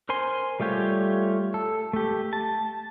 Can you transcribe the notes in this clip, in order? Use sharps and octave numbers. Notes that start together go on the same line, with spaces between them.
A#4 C5 G#5 C6
G3 A3 F4 G4 C#5
A4
A3 G4
A5